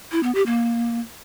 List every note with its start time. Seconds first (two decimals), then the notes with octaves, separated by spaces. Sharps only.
0.12 E4
0.23 B3
0.35 G4
0.46 A#3